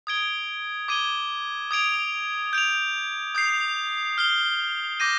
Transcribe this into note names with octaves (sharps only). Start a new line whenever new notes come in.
D#6 G#6 D7 G7
D6 G#6 D#7 G7
D#6 G#6 D7 F7
G6 D7 F7
D#6 G6 C7
F6 C7 G7
D6 G6 A#6 D#7